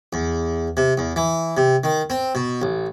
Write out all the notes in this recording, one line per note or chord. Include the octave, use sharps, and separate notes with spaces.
E2
C3
E2
E3
C3
D#3
C4
B2
A1